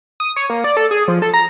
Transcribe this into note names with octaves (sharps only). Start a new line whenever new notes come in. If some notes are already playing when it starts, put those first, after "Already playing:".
D#6
C#5
A#3
D5
A4
G#4
F3
A4
A#5